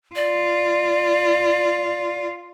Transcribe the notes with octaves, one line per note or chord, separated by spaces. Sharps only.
F4 D5